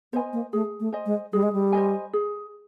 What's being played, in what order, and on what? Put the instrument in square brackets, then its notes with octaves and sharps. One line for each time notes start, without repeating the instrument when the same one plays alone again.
[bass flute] B3 [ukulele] C5 D#5 G#5
[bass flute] A#3
[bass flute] A3 [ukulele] G#4
[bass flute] A3
[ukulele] C5 D#5 G#5
[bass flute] G#3
[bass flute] G3 [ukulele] G#4
[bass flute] G#3
G3
[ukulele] C5 D#5 G#5
G#4